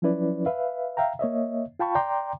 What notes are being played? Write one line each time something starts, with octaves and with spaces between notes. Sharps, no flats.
F3 F#3 C#4 E4 B4 D5
B4 E5 F5
E5 F5 G5 A#5
A#3 C#5 D#5 E5
F4 F5 G5 A5 B5 C#6
D5 G5 A#5 C6 D6